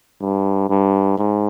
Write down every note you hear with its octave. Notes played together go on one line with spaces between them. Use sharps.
G2
G2
G#2